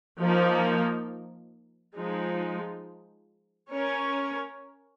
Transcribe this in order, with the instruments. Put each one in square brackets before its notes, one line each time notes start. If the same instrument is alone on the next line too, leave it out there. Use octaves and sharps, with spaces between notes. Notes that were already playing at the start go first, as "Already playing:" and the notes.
[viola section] F3 A#3 D#4 A#4
F3 G#3 D#4
C#4 A#4 C#5